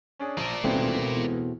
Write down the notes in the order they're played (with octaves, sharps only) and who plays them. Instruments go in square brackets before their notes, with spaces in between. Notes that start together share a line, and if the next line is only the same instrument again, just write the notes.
[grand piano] C#4 D4 G#4
[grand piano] A#1 D#7 [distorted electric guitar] A#4 D5
[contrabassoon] D#1 [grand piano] C#2 E3 B3 [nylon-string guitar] B2 A3 C4
[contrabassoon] E2